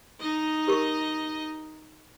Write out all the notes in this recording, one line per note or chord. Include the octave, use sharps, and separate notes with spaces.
D#4 D#5
G4 A#4 C#6